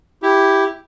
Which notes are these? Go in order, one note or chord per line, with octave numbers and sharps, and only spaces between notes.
E4 G4